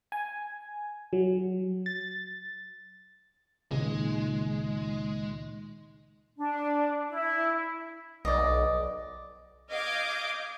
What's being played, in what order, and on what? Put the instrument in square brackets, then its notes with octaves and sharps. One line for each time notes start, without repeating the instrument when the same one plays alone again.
[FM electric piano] G#5
F#3
A6
[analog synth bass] C#2 [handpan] A#2 D#3 [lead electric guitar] G#3
[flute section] D4
E4
[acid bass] B1 [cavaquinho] D5 D#5
[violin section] D#5 F5 D6 D#6 G6 G#6